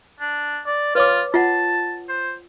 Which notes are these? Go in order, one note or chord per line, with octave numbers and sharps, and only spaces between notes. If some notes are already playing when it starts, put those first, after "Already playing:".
D4
D5
F4 B4 C#5 D6
F4 F#5 A5
C5